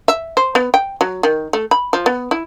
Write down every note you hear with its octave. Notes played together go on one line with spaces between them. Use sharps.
E5
C5
B3
G5
F#3
D#3
A3
B5
F3
B3
E4